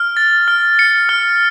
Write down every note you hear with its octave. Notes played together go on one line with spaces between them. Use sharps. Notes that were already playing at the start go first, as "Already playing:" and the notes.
Already playing: F6
A6
F6
C#7
F6